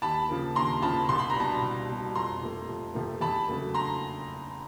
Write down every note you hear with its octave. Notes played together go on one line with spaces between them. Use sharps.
D#2 A5 B5
C#3 F3 A#3
D#2 A#5 C6
C#3 F3 A#3 A5 B5
C2 C6
B5
A#5
B2 G3 A5 B5
C2
B2 G3
F2 A#5 C6
C3 F3 A3
F2
C3 F3 A3
E2 A5 B5
C#3 F#3 A3
A#5 C6